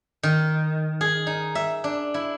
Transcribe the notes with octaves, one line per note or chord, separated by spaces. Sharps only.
D#3
G#4
D#4
E5
D4
E4